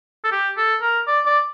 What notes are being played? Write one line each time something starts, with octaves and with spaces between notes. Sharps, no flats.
A4
G4
A4
A#4
D5
D5